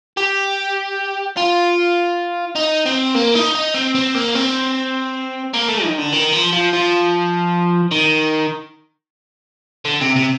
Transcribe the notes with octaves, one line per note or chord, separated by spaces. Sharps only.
G4
F4
D#4
C4
A#3
D#4
D#4
C4
C4
A#3
C4
A#3
A3
D#3
D3
D#3
F3
F3
F3
D#3
D3
C3
C3